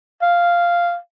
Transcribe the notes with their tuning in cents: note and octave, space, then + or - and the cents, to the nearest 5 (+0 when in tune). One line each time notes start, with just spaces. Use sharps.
F5 -5